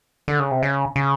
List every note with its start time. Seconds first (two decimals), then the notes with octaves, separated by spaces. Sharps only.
0.28 D3
0.39 C#3
0.51 C3
0.63 C#3
0.96 C#3